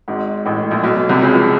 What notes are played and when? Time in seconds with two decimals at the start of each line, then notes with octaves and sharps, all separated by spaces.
0.08 G#1 G#2
0.45 A1 A2
0.60 A2
0.71 A#1 A#2
0.83 B1 B2
0.96 B1 B2
1.09 C2 C3
1.22 C#2 C#3
1.34 F3